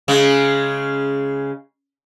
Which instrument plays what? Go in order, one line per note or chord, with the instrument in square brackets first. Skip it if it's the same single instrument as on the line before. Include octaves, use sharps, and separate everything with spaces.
[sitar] C#3 G#3